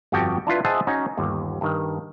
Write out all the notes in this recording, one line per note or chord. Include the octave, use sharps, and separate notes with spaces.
G1 F2 F#4 G4 G5 A5
D4 E4 F4 B4
G#4 C5 D#5 E5 F#5 A5
C#4 D#4 F#4
G1 D#2
G2 D#3